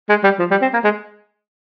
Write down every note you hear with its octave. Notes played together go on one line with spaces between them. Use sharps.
G#3
G3
F3
G3
C4
A#3
G#3